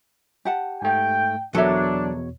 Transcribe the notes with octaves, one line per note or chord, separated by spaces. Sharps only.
G4 F#5 A5
G#2 A3 G5
E2 B2 F#3 D4 A4 A#4 C#5 E5